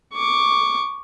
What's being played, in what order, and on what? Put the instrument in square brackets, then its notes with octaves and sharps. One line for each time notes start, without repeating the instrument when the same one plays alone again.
[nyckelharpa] C#6 D6